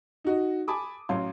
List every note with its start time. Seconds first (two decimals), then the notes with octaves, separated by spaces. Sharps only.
0.24 D#4 F#4 D#5
0.68 G#5 A5 B5 D6 D#6
1.09 A1 F#3 F5 C6